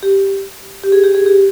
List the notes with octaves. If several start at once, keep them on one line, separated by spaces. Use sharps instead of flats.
G4
G4
G#4
G4
G#4
G4